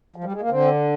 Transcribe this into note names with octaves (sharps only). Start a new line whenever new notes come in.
F3
G3
G#3
A#3
D3 C4